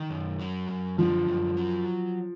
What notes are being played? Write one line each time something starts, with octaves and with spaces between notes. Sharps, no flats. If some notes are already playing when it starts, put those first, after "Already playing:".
Already playing: D#3
F#2
F#3
F#2
D3 F3
F#2
F#3